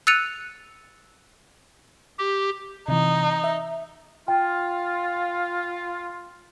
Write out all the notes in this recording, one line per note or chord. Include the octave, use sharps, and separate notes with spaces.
E6 F#6 A6 C#7 D#7 F7
G4
C3 E3 D#4
E5
F4 G5